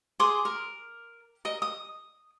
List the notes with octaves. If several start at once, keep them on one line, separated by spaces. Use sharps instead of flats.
G#4 C6 D6 D#6
A#4
A#4 D#5
D#6